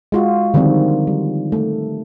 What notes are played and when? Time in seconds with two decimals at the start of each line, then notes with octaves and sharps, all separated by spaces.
0.12 G#3 F4 F#4
0.54 D3 D#3 F3 G3 C4
1.07 G3
1.52 A3